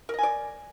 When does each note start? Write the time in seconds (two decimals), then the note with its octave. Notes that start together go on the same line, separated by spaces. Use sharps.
0.09 A#4
0.14 D#5
0.19 G#5
0.23 D5